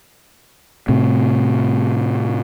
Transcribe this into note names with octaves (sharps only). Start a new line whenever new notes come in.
A2 C3